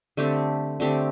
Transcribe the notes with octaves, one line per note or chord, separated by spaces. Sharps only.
D3 A3 C4 G4
D3 A3 C4 G4